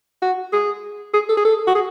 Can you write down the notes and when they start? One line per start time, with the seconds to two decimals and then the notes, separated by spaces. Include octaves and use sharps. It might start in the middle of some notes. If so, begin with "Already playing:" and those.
0.22 F#4
0.53 G#4
1.14 G#4
1.29 A4
1.37 G#4
1.45 A4
1.67 F#4
1.75 G#4